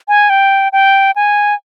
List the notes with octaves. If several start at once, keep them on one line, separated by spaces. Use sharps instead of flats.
G#5
G5
G5
G#5